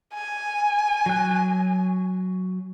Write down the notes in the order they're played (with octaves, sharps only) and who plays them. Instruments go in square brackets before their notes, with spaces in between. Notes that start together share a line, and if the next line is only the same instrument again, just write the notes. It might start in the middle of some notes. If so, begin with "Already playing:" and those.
[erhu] G#5
[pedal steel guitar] F#3 F#6